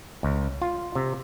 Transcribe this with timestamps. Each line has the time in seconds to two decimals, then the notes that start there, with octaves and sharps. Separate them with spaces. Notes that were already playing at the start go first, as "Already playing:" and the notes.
0.23 C#2
0.62 F4
0.95 C3